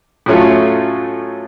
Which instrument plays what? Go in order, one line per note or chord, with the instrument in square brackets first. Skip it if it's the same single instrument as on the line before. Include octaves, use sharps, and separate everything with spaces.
[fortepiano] A2 F#3 A3 C#4 F4